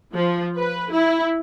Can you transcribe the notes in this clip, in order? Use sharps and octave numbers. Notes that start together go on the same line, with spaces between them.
F3
B4
E4